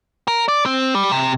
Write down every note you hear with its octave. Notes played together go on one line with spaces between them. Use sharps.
A#4
D5
C4
G3
C3